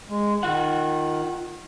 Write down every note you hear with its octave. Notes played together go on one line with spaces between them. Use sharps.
G#3
D#3 F4 F#5